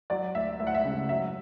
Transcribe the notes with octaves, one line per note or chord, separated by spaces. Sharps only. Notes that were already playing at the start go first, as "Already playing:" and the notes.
F#3 D5
D2 E5
D2 E5
F#5
E5
C#3
F#3 E5